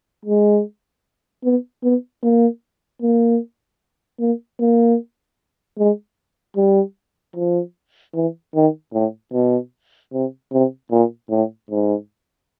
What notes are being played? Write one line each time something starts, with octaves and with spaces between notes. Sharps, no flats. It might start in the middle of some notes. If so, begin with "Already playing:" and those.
G#3
B3
B3
A#3
A#3
A#3
A#3
G#3
G3
F3
E3
D#3
A2
B2
C3
C3
A#2
A2
G#2